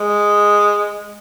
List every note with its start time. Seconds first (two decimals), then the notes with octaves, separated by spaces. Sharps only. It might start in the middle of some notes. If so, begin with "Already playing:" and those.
Already playing: G#3